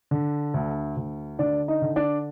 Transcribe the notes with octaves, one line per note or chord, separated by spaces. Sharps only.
D3
D2
D2
D3 D4 D5
D#4 D#5
D3
D4 D5